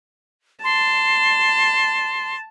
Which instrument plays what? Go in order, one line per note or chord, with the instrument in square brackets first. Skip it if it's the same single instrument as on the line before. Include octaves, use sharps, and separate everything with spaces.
[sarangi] A5 [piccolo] C6